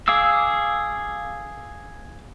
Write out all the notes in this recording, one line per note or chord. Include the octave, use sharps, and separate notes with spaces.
G#4 F5 D6 E6